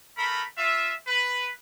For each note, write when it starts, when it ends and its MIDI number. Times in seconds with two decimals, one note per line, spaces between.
0.16 0.41 57
0.16 0.41 70
0.16 0.41 83
0.57 0.92 65
0.57 0.92 76
1.07 1.48 71